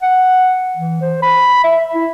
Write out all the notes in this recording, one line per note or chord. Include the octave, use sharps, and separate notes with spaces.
F#5
E3
C5
B5
E5
E4